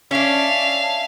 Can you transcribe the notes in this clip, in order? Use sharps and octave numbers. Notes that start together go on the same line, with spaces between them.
C#4 D4 E5 F5